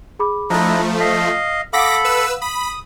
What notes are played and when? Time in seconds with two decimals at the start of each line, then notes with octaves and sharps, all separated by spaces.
0.19 G#4 B5 D6
0.50 F3 A3 D4 E4 D#5 A#5
1.00 D#5 F5 B6
1.73 A4 F5 F#5 B5 D6 D#6 A#6 B6
2.04 B4 E6
2.42 B5 D#6